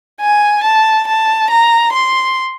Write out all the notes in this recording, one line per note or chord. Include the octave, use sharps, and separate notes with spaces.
G#5
A5
A5
A#5
C6